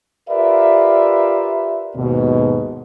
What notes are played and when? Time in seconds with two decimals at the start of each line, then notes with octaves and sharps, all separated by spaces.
0.30 F4 G4 A#4 B4 D5 E5
1.96 D#2 G#2 B2